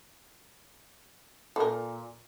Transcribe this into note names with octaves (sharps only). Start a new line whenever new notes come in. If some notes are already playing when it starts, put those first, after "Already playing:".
A#2 A4 A#4